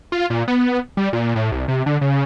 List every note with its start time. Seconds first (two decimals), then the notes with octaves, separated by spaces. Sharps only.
0.12 F4
0.30 A#2
0.48 B3
0.97 G3
1.13 A#2
1.36 A2
1.52 C2
1.68 C3
1.86 D3
2.01 C#3